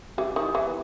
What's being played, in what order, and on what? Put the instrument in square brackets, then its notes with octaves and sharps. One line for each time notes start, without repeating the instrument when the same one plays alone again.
[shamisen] E3 [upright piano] G4
[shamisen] D#3
[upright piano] E4
[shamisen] E3
[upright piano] B3